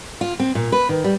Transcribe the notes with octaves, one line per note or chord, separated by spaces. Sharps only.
F4
C4
A#2
B4
D#3
G3